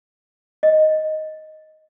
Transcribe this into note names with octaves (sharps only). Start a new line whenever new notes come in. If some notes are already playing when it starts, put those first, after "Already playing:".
D#5